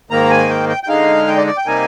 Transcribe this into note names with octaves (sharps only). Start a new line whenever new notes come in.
G#2 D#3 A#3 A#5
G#5
G5
G5
G5
D3 G#3 D#4 F5
G5
D5
D5
G5
C3 G3 A#3 D#4 G#5